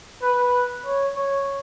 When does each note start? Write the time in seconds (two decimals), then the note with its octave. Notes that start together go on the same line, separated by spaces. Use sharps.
0.22 B4
0.85 C#5
1.16 C#5